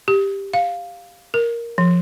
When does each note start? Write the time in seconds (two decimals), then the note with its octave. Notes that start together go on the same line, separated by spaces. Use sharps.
0.08 G4
0.54 F5
1.34 A#4
1.78 F3